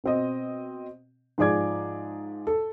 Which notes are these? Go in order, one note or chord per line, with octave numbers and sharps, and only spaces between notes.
B2 C4 D#5
G#2 F3 G#4 D5 D6 G#6
A4